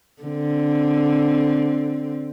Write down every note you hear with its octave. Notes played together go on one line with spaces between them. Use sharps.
D3 C4